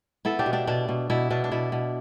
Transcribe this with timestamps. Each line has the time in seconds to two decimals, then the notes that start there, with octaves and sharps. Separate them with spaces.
0.25 B3 E4 A4
0.39 D4 G4
0.46 B2
0.53 D4 G4
0.67 B2 D4
0.88 B2
1.10 B2 E4
1.30 B2 D4
1.44 D4
1.52 B2 E4
1.72 B2